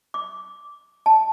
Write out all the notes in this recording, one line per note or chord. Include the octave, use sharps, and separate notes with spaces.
D6
A5